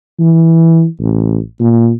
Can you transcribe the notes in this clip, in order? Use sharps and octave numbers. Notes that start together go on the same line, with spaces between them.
E3
A1
A#2